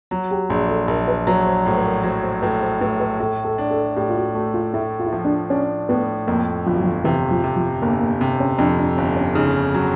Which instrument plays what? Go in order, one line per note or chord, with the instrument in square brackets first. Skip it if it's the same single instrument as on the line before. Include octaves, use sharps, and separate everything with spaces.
[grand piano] F#3 [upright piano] F#4
[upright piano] G4
[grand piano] A#1 [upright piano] G#4
[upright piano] A4
[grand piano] A#1 [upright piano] A#4
[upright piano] B4
[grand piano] F#3 [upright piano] B4
[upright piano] C5
[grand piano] A2 [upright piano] C5
[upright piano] B4
A#4
[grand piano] F#3 [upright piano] C5
[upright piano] C5
[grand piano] A2 [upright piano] B4
[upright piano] C5
[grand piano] A2 [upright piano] B4
[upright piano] B4
[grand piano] A2 [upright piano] A4
[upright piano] A4
[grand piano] D4
[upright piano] A4
[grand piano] A2 [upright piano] G4
[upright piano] F4
F#4
[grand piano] A3 [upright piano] F#4
[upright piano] F4
[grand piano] A2 [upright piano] E4
[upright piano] F4
E4
[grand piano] F3 [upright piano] F4
[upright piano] D4
[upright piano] C#4 [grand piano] D4
[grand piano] A2 [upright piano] B3
[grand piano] F2 [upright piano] A#3
[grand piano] G1 [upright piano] F3
[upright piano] F#3
F3
[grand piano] C3 [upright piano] E3
[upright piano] F3
[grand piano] C3
[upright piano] F3
[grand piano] G1 [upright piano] A#3
[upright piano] A#3
[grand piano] C3 [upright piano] C4
[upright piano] C#4
[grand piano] F2 [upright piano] D4
[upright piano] D4
[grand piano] G1 [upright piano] C#4
[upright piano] C#4
[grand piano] C#3 [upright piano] D#4
[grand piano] F#3